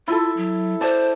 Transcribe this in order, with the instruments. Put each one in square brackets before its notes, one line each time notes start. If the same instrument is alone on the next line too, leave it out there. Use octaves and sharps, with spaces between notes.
[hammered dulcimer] E4 A4 [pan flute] F4
[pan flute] F#3
[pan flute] C5 [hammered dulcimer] D5 A5